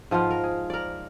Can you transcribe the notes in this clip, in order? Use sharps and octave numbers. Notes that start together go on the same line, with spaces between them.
G#2 F3 B3 F4
A#4
G#4
A#4 D5